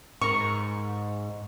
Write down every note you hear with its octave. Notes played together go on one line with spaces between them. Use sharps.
G#2 A#4 C#6